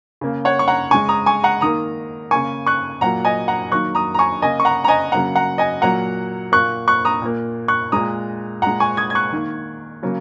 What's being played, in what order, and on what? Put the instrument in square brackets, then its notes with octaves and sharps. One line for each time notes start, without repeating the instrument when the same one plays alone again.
[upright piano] C#3 A#3
C#5 F#5
C#6
F#5 A#5
C#3 G#3 G#5 C#6
A#5 D#6
G#5 C#6
F#5 A#5
D#3 A#3 A#5 D#6
C#3 A#3 G#5 C#6
C#6 F#6
A#2 F#3 A#3 F#5 A#5
D#5 G#5
F#5 A#5
D#3 F#3 A#3 C#6 F#6
A#5 D#6
A#5
G#5 C#6
C#3 A#3 D#5 G#5
C#6
F#5 A#5
A#5
D#5 G#5
C#3 F#3 A#3 F#5 A#5
F#5 A#5
D#5 G#5
A#2 F#3 A#3 F#5 A#5
A#2 A#3 C#6 F#6
C#6 F#6
A#5 D#6
A#2 A#3
C#6 F#6
A#2 G#3 A#5 D#6
A#2 G#3 F#5 A#5
G#5 C#6
D#6 G#6
G#6
C#6 F#6
D#3 A#3
C#3 F#3 A#3